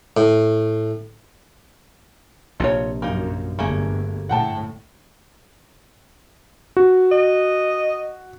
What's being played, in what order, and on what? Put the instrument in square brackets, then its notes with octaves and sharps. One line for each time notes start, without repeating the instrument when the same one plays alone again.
[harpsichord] A2
[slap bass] A#1 C3 [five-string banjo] F4 C#5
[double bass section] F#2 [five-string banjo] A#3 D#4
[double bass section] G1 [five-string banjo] A3 A#3 G#4
[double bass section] A2 [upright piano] F#5 G5 A5
[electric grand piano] F#4
[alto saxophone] D#5